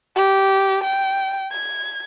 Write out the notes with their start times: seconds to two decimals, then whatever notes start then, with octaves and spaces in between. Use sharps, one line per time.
0.16 G4
0.84 G5
1.52 G#6